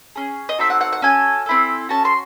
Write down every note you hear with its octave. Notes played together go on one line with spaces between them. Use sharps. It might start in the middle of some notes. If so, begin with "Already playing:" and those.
C#4 G#4
D#5
C4 D#4 F#4 A4 E5
F#5
F#5
F#5
C#4 F#4 A4 G#5
C4 E4 A4
C#4 F#4 A4 A5
C6